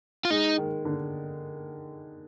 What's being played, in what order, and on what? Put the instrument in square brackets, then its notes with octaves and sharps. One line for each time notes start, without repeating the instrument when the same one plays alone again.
[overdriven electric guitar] F4
[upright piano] G#3 [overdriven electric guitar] D#4
[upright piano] D#3
D3